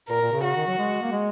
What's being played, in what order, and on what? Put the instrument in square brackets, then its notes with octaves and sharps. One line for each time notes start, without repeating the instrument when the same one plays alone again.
[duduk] A#2 [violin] A#4
[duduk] A#2
C#3
[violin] F#4
[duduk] D#3
F#3
G#3
A#3
G#3